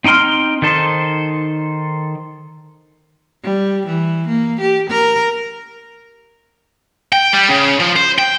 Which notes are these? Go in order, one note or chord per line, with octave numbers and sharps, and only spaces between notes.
C4 D#4 G5 C6 F6
D#3 D#4 A4 C5
G3
E3
A#3
G4
A#4
G5
G3
C#3
F3
C5
G5